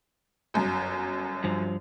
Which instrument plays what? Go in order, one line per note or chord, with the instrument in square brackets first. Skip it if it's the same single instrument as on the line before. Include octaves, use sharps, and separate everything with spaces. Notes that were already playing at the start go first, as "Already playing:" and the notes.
[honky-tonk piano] G1 F#2
[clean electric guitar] G2 F3